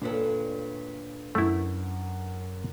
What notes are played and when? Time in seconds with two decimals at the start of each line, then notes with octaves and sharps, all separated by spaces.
0.02 D2 A#2 C#4 D4 A4 B4
1.35 F#2 A3 E4